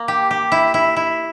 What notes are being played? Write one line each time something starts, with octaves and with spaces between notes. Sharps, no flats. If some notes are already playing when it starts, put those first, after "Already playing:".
Already playing: A#3
G4
G4
E4
E4
E4